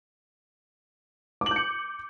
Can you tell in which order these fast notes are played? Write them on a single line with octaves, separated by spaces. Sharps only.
D6 F#7 G6 C#7